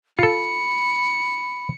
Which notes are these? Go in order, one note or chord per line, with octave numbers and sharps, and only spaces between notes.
F4 A4 B5 C#7